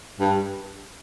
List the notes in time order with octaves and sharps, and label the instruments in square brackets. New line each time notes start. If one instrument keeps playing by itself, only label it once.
[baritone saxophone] G2